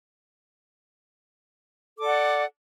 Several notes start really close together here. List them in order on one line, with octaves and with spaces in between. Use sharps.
A4 D6 D5 F#5